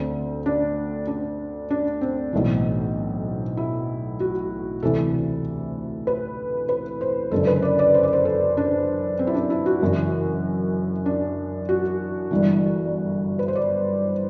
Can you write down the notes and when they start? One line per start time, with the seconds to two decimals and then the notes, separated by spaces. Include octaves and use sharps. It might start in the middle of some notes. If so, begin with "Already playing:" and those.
Already playing: D2 D3 C4
0.46 D4
1.07 D4
1.70 D4
2.01 C4
2.33 B1 A2 E3
3.57 E4
4.20 F#4
4.83 D2 C3 E3 A4
6.07 B4
6.69 B4
7.01 C5
7.31 F#1 F#2 D3 A4
7.47 B4
7.62 D5
7.79 D5
7.94 C5
8.03 D5
8.13 C5
8.25 A4
8.57 D4
9.19 C4
9.27 E4
9.34 D4
9.50 E4
9.66 F#4
9.81 F#1 F#2 E3
11.06 D4
11.69 F#4
12.31 G1 G2 E3
13.39 B4
13.48 C5
13.55 D5